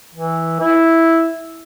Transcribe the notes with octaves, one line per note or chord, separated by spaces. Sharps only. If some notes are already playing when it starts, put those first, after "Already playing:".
E3
E4